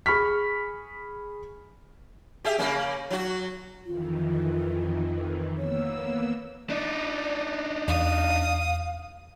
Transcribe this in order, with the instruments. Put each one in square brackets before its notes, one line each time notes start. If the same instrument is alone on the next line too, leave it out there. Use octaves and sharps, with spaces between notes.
[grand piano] G#4 B5 C#6 F6 B6
[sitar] G4 G#4 E5
C#3 A#3 C#4
F#3 F#4
[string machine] F2 D#3 E3 [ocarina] F4
[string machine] A#3 B3 E6 [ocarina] C#5
[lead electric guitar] D4 D#4 [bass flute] D5
[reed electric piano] E2 [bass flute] F5 [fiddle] D#6